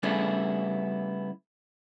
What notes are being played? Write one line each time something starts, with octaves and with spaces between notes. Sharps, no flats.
C#3 G3 A3 B3 D4 E4